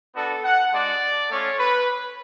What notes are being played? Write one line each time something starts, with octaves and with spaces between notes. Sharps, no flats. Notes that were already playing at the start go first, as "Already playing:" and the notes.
B3 D4 F#4 A4
F#5
G#3 D4 F#4 D5
A3 C#4 F4 C#5
B4